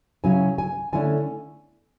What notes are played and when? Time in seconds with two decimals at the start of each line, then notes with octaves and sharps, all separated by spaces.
0.24 C#3 F#3 C#4 E4 G#5
0.58 G#5
0.93 D3 A3 C#4 E4 G#5